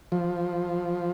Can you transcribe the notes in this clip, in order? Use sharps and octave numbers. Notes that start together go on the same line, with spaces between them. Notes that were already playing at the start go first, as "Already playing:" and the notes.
F3